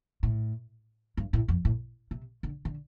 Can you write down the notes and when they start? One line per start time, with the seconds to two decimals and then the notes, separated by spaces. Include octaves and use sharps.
0.23 A2
1.17 G2
1.33 A2
1.48 F2
1.65 A2
2.11 C3
2.43 D3
2.65 D3